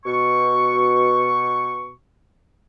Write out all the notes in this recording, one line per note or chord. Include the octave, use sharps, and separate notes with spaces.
B2 C#6